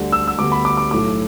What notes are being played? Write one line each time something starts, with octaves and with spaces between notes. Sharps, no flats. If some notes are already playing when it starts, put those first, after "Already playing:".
Already playing: D2 D3 G3
E6
E6
D2 D3 G3 B3 D6
B5
D6
D6
B1 A2 A3 D6